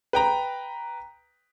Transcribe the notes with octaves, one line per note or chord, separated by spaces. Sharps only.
B4 G5 A#5